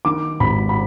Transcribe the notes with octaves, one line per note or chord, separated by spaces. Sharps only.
D#3 D6
G#1 B5
B5